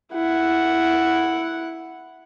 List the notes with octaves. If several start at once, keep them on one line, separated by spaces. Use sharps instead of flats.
E4 F#5